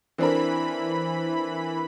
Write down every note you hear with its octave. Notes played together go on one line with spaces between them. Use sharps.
E3 C4 D4 A#4 B5